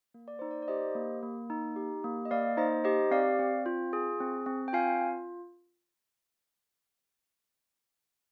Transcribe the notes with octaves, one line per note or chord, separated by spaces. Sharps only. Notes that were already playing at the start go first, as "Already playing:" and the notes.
A#3
D5
D#4 C5
D5
D5
G4 C5 D#5
A#3
A#3
D#4
G4
A#3
D#5
A#3 D5 F5
D#4 C5 D#5
G4 C5 D#5
C4 D5 F5
C4
F4
G#4
C4
C4
G5
F4 F5 G#5